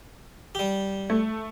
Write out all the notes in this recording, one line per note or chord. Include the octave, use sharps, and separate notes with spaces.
G3 G4
A3